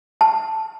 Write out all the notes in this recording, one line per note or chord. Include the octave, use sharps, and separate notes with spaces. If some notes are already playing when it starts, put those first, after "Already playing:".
A5